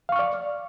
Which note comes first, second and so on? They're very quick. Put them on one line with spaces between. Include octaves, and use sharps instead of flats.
F5 C#6 F6 D5